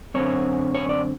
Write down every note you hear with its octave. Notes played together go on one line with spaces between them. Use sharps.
F#2 D3 F#3 A3 C4 C#5
C#5
D5